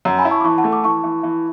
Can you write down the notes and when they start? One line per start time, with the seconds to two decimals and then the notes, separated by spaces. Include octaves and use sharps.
0.05 F#2
0.18 G#5 B5
0.25 E4
0.31 A5 C#6
0.41 D6
0.44 E3 A5 C#6
0.58 F#5 A5
0.64 A3
0.73 D6
0.84 E3 A5 C#6
1.04 E3
1.23 E3